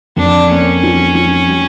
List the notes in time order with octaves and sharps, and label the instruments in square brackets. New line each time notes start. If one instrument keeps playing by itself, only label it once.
[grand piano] F2 [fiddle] D4
[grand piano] A#3 [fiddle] C#4
[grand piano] F3
F3
G3